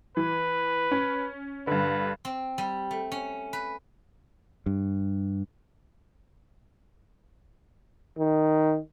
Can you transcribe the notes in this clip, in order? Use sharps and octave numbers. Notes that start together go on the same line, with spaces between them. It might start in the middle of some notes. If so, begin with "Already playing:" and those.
E3 B4
C#4
G2 D3 B4
C4
G3
A3
C#4
B4
G2
D#3